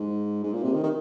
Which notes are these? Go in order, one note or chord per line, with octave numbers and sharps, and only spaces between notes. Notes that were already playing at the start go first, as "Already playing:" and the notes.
Already playing: G#2
G#2
A#2
C3
D#3
D#3